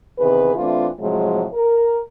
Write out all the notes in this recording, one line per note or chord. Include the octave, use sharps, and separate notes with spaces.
E2 C3 D#3 G#4 B4
E3 A3 C4 D4 E4 F4
A2 C3 F3 F#3 G#3
A#4